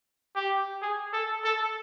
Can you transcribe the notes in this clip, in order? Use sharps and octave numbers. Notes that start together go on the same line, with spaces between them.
G4
G#4
A4
A4